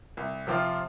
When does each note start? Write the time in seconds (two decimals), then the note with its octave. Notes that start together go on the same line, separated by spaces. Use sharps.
0.17 C2
0.47 C3 F3 C4 F4